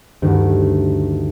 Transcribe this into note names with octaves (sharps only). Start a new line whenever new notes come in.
D2 G2 D#3 A3